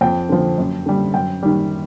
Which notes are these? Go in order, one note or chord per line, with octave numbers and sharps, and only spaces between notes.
F2 G5
D3 F3
F#2
D3 G3
F#2 G5
D#3 G3